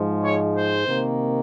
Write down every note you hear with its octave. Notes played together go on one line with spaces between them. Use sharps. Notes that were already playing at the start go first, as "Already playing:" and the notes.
Already playing: G#2 F3 G#3
C#5
C5
C3 D#3 A#3